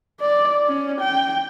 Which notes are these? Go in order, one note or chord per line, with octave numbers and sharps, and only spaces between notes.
D5
C#4
G5